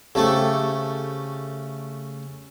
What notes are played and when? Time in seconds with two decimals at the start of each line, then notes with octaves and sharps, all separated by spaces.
0.15 C#3 A3 C4 G4 A4